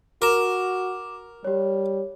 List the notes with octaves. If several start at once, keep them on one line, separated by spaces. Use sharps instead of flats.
F#4 A#4 D6 E7
G3 G4 C#5